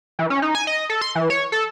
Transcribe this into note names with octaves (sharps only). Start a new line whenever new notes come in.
E3
C#4
D#4
G#5
D#5
A4
C6
E3
C#5
A4